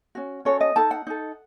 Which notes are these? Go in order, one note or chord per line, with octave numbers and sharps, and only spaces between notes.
C#4 F#4
C#4 F#4 A4 C#5
D#5
D#4 A4 A5
F#5
D#4 A4